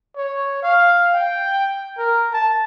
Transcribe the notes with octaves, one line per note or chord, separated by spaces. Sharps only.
C#5
F5
G5
A#4
A5